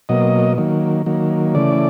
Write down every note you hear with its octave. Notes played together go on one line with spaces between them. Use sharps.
B2 F#3 A#3 D#5
D#3 F#3 A#3
D#3 F#3 A#3
C#3 E3 A3 D5